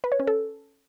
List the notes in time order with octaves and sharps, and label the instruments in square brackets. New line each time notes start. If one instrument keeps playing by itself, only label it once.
[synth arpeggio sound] B4
C#5
C#4
A4